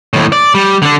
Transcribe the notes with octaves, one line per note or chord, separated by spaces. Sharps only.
D#2 A2
D5
G3
D3 D4